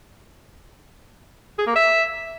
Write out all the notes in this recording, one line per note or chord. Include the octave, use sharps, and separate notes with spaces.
G#4
A#3
E5